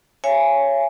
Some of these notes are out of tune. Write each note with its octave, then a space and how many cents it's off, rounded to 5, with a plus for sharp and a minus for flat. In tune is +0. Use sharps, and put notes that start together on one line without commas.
C#5 +0 E5 +40 G#5 +0